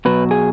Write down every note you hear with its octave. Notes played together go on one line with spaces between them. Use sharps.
B2 F#3 B4
G#4